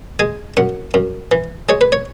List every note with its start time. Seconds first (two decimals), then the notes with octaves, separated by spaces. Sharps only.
0.19 G#3 G#5
0.57 F#2 F#5
0.94 F#2
1.32 E3
1.69 G#3 C#5
1.81 B4
1.92 C#5